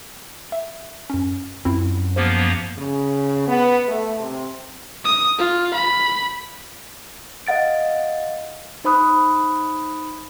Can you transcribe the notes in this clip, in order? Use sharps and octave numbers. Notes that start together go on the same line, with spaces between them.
E5
F#2 C#4
F#2 C4 E4 F4
F3 A#3 B3 G4 C5
C#3
B3
A3
C3
D#6
F4
B5
D#5 F5 F#5 A6 D7
D#4 C5 B5 D#6 F#6